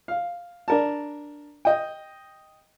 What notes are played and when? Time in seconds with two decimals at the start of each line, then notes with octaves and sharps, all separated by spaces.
0.08 F5
0.68 D4 A#4 A5
1.65 D#5 G5